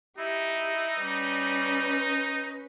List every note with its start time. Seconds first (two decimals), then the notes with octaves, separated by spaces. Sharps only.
0.19 D#4 E4 G4
1.00 G3 C#4 B4